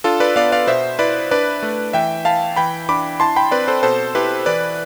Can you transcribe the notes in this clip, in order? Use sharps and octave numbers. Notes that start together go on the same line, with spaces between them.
D4 F4 A4
B4 D5
B3 D5 F5
D5 F5
B2 C5 E5
E4 B4 D5
D4 B4 D5
A3
E3 E5 G5
E4 F5 A5
E3 G5 B5
D4 B5 D6
E4 A5 C6
G5 B5
C4 B4 D5
A4 C5
B2 A4 C5
E4 G4 B4
E3 B4 D5